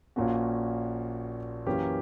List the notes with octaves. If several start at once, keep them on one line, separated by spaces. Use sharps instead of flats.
A#1 A#2 A#3 C#4 F#4
F#2 E3 A#3 C#4 G4